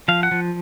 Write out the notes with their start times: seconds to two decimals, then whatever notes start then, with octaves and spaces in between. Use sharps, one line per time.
0.08 F3 F5
0.23 F#5
0.31 F3